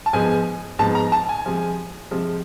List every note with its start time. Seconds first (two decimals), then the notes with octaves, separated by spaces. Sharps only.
0.06 A5
0.13 G#2 F3 G#3 B3 G#5
0.79 G#2 F3 G#3 B3 A5
0.95 A#5
1.12 A5
1.29 G#5
1.46 C3 F3 G#3
2.11 C3 F3 G#3